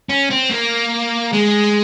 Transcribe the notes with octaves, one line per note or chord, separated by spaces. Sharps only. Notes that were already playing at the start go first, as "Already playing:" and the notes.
C#4
C4
A#3
G#3